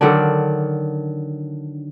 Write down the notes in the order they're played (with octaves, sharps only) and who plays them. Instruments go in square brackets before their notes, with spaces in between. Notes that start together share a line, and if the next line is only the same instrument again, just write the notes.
[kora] D3 D#3 F#3 D4